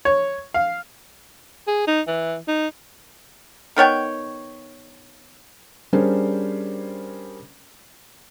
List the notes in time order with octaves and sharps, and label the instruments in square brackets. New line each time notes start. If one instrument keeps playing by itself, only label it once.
[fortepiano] C#5
F5
[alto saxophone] G#4
D#4
E3
D#4
[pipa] D#3 B3 C#5 G5
[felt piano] G3 C#4 D4 G#4 A#4 C5